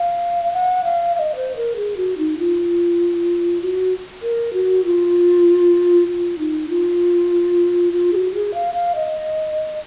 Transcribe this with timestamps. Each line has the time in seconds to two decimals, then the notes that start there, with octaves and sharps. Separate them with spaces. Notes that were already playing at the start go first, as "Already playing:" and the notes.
Already playing: F5
0.53 F#5
0.84 F5
1.15 F5
1.19 D#5
1.36 C5
1.56 A#4
1.76 G#4
1.97 F#4
2.18 D#4
2.39 F4
3.62 F#4
4.23 A#4
4.53 F#4
4.85 F4
6.08 F4
6.39 D#4
6.69 F4
7.93 F4
8.13 G#4
8.16 F#4
8.34 G#4
8.54 F5
8.75 F5
8.95 D#5